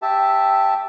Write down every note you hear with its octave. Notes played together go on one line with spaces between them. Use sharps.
G4 E5 A5